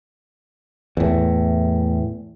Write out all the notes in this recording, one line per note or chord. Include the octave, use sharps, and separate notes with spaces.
E2 A2